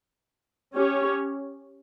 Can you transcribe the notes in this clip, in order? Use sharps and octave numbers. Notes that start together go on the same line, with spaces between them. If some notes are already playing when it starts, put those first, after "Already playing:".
C#4 G4 C#5